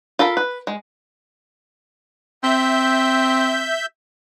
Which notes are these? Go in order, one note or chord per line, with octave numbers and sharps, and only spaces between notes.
F4 A4 A#4 B5
B4
G#3
C4 E5 G6